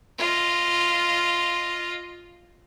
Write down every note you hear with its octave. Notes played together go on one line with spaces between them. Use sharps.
F4 D#5